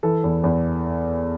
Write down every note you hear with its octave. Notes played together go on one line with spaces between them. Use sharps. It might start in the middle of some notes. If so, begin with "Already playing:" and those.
E3 A4
E2
E2